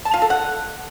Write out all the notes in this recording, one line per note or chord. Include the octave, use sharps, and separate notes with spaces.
A5
F4
A4
F#5